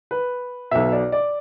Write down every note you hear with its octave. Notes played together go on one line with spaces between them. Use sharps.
B4
B1 B2 E5
D5
D5